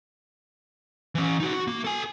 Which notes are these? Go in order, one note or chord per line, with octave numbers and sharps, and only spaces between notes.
E3 C#4
D#4 F#4
F#4
A#3
A4 G#5